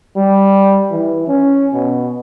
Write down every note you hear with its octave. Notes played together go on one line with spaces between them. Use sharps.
G3
E3
C#4
B2